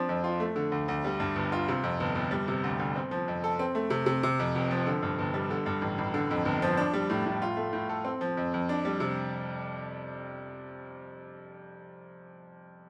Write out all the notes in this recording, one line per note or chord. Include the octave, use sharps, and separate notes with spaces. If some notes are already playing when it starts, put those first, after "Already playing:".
Already playing: F3 C4 D4
F2
F4
A3
D3
D2
D2
G3
G2
G1
F4
C3
F2
G1
G1
G3
C3
D2
D2
C4
F3
F2
A4
C4
A3
C3
C3
C3
F2
F1
F3
D3
G2
G1
G3
D3
G2
A1
A1
D3
F2
G1
F3
D4
G3
A2
A2
F4
A3
A2
A4
C4
F3
F2
F2
D4
G3
C3